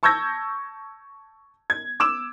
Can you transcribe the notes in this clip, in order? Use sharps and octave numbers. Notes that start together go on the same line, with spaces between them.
A5 C#6 E6 G6 G#6 A#6
G#6
D6 E6 E7